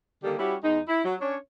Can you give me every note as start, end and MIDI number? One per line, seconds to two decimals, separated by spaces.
0.24 0.34 50
0.24 0.34 51
0.24 0.34 55
0.24 0.34 58
0.24 0.34 67
0.39 0.55 55
0.39 0.55 61
0.39 0.55 64
0.39 0.55 66
0.39 0.55 67
0.64 0.80 40
0.64 0.80 56
0.64 0.80 63
0.88 1.03 64
1.05 1.15 54
1.21 1.37 61
1.21 1.37 62
1.21 1.37 73